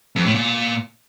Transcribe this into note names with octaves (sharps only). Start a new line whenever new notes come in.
F2
A2
A#2